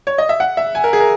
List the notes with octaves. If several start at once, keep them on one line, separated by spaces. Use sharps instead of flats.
C#5
D#5
E5
F#5
E5
G#5
A#4
G#4
A#4